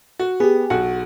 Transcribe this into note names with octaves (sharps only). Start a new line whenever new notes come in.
F#4
B3 G4 G#4
B1 F#4 F#5